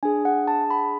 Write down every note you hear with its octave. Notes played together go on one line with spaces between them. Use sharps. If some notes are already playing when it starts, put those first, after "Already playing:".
D4 G#4 G#5
F#5
A5
B5